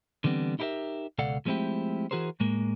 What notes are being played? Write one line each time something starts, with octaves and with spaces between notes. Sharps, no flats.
D3 E3 G3 B3 C4
D#4 E4 G4 G#4 A#4 E5
C#2 B2 A4 D5 F5 F#5
F3 G#3 A3 C4 E4 G4
E3 F#4 G#4 A#4 C5
A2 G#3 A#3